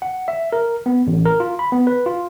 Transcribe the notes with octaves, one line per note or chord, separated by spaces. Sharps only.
F#5
E5
A#4
B3
A1
A#4
F4
B5
B3
B4
F4